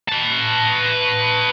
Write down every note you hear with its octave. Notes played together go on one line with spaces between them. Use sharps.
B4 A5